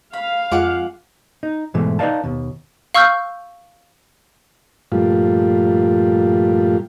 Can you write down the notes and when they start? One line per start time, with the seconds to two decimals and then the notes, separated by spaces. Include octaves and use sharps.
0.13 F5 B5
0.51 F2 G#3 F4 G#4 F#5 D6
1.43 D#4
1.74 G#2 B2 E3 G#3 A3
1.99 D#4 B4 D5 D#5 F5 A5
2.24 D#2 B2
2.95 F5 C#6 E6 F6 G6
4.92 G2 A#2 F3 G3 A3 F4